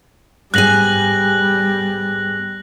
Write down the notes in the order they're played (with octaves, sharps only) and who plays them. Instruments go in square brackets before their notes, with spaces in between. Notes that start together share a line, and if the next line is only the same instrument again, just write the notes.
[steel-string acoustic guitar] G#2 B3 G#5 [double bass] G3 [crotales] F#6 A#6 F#7